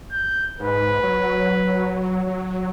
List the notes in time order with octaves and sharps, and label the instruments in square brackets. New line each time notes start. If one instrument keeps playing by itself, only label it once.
[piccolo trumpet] G6
[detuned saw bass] G#2 [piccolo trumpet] B4
[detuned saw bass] F#3
F#3